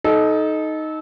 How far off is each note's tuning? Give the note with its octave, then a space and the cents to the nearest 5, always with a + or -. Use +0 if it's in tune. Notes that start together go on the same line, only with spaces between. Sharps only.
D#4 +5 A4 -25